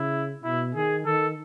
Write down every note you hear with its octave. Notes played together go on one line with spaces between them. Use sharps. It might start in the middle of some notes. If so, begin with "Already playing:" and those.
Already playing: C#3 E4
B2 E4
D#3 G#4
D#3 A4